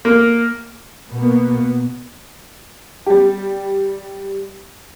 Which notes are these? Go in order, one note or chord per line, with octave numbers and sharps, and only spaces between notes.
A#3
B2 A#3 B3
G3 G4